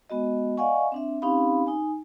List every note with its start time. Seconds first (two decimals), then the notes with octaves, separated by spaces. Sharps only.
0.10 G#3 B3 F#4 D#5
0.57 D5 D#5 F5 F#5 G#5 C#6
0.92 C4 D4 E5
1.22 C4 C#4 D#4 G4 F5 B5
1.67 D#4 G#5